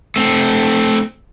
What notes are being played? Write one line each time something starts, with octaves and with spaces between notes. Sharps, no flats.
A3 C4